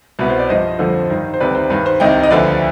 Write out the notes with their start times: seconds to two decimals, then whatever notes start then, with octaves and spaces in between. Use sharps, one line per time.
0.19 C2 B2 B4
0.30 C5
0.39 D5
0.49 G2 F3 C5 D#5
0.79 F2 D3 F3
1.10 G2 D#3
1.34 C5
1.40 D2 C3 D#3 B4 D5
1.55 C5
1.70 G2 D#3 B4
1.86 C5
2.00 C2 C3 D#3 D#5 G5
2.23 D#5
2.30 D2 D3 F3 B4 D5